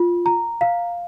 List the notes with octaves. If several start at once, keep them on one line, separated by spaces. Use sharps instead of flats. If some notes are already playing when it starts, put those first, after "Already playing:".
Already playing: F4
A#5
F5